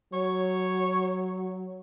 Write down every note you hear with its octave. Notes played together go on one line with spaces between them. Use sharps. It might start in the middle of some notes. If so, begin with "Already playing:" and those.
F#3 C#5